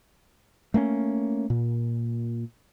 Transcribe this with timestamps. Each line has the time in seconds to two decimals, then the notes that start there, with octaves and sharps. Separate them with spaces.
0.74 A3 A#3 C4 C#4
1.50 A#2